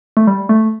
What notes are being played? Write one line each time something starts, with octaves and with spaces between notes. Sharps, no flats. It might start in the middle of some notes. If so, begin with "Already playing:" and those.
A3
G3
A3